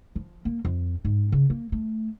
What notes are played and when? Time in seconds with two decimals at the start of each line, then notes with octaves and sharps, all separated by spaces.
0.16 F3
0.45 A#3
0.65 F2
1.05 G#2
1.32 C#3
1.50 A#3
1.72 A3